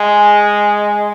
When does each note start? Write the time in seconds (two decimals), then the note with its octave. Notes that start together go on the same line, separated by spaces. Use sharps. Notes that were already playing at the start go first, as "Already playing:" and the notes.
Already playing: G#3